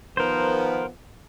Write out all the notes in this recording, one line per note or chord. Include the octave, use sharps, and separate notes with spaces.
D#3 F3 B3 A#4 C5